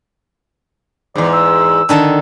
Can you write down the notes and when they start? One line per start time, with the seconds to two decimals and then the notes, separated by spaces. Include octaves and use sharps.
1.16 E2 G#2 D5
1.33 E6
1.89 D3 D#3 A4